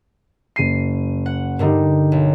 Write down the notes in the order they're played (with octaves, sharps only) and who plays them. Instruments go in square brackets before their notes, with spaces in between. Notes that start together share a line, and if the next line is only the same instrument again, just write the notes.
[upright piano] F#1 D#7 [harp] C7
[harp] F#5
[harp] G2 D3 G3 [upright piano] D#4 G4 A#4
[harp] B1